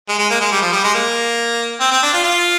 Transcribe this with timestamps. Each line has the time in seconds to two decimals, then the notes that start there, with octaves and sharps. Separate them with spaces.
0.09 G#3
0.19 G#3
0.30 A#3
0.41 G#3
0.52 G3
0.61 F3
0.72 G3
0.84 G#3
0.94 A#3
1.81 C4
1.91 C4
2.03 D4
2.13 F4
2.24 F4